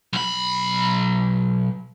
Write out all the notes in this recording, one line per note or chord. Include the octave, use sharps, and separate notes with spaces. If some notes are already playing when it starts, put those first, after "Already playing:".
B1 B5